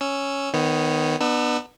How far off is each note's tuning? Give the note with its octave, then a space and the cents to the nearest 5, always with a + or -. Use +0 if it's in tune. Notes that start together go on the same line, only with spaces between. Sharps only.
C#4 +0 E6 +0
D#3 +0 B3 +20 C#5 -20
B3 -10 D4 +40 E6 +0